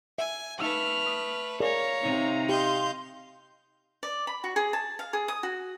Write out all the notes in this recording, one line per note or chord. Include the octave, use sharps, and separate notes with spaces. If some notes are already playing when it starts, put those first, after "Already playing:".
E5 G#5
A3 D#4 B4 F5 E6 F6
D#6
G#4 A#4 C#5 D5 F5 A#5
C3 C4 D#4
G4 D#5 F5 C6 G6
D5
B5
F#4
G#4
A5
F5
G#4
D#6
F#4